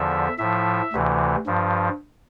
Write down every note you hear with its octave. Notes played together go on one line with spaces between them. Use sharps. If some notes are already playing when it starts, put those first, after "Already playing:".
Already playing: E2 D3 F3 E5
A2 F3 E5
D2 C3 E3
G2 F3